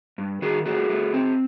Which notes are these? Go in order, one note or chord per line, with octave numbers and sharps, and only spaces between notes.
G2
D#3 F#4 G#4
A3 F#4 G#4
A3
C4